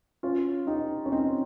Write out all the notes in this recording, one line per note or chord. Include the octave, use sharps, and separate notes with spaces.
C#4 F4
D#4 G4
C#4
C4 D#4